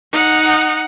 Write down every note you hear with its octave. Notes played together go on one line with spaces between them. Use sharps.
D#4 F#5